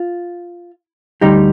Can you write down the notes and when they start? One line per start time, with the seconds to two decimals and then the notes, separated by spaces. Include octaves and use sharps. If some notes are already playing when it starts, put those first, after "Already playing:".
Already playing: F4
1.21 D2 D3 G3 D#4 G4